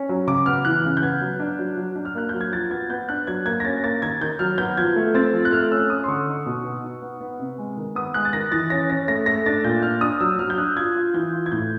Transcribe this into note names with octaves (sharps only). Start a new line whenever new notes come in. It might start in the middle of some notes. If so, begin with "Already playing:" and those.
Already playing: C#4
F#3
C#3 D6
B3 F6
E3 F#6
C#3
G6
B3 G#6
F#3
D4
F#3
F#3
D4
F6
A#3 F#6
F#3 G6
G#6
F3 A6
B3 G#6
B3 G6
D4 F#6
F#3 G#6
A#3 G#6
A#6
C#4 A6
A#3 A6
D#3 G#6
D#3 G6
F#3 F6
B3 G6
F3 G#6
A3
C4 A6
F3
F#6
A3 F6
C#4 E6
C#4 D#6
C6
D3 C#6
D#4
B2
B3
D#4
B3
B3
C3
G#3
D#3
B3 D#6
G#3 F#6
A6
D#3 A#6
E3 A6
C#4 A#6
C#4 A#6
A3 A#6
A3 A#6
D4 A6
A#2 G6
D4 F6
D4 D#6
F#3 E6
F#3 F6
G6
D4 F#6
F4 G#6
F4
E3 G6
F4
G#6
A2 G6